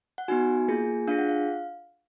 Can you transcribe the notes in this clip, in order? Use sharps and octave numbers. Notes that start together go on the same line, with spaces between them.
F#5
B3 D#4 F#4 G#5
A#3 F4 G#4
D4 F4 G#4 F5
F#5
F5